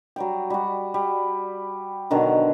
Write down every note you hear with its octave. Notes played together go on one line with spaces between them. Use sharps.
F#3 G3 G5
G3 F#4
G3
B2 D3 D#3 F#3